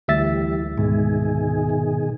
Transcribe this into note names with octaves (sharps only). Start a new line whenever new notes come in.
D2 E3 G3 E5 A6
G#2 B2 D#3 G#4